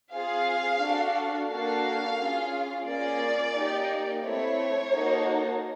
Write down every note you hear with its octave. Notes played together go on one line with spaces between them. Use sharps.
C4 F4 G#4 F5
D4 F#4 A4
A#3 D4 F#4 A4 F5
C#4 F4 G#4
A#3 C#4 F4 G#4 D5
A#3 D#4 G4
A3 C4 E4 C#5
A#3 D#4 F#4 A4